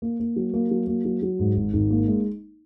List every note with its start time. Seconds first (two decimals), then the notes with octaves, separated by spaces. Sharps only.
0.02 A#3
0.20 A#3
0.36 F#3
0.53 A#3
0.71 F#3
0.87 A#3
1.05 F#3
1.22 F#3
1.39 G#2
1.56 G#1
1.73 G#1
1.90 A#3
2.08 G#3